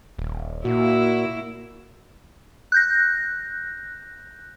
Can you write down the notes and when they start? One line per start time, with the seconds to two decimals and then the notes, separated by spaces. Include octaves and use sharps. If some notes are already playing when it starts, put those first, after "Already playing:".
0.19 D#1
0.65 A#2 A#3 E4 F#4
2.72 F#6 G6 A#6